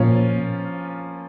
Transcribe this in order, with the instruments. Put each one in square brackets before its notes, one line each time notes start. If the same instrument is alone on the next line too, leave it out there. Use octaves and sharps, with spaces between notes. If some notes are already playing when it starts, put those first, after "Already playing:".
Already playing: [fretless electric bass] A#2 [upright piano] F3 A#3 C#4 F4